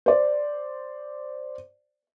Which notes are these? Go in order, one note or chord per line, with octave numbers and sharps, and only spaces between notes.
C5 D5